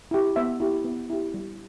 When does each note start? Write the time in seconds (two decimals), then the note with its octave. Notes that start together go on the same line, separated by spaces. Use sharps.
0.11 E4 G4
0.36 B3 E5
0.60 E4 G4
0.85 B3
1.10 E4 G4
1.34 G3